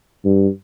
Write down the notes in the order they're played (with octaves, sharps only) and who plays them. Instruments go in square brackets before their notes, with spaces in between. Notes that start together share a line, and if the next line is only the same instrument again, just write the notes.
[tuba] G2